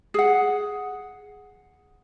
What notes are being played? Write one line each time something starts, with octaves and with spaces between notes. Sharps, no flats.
G#4 F#5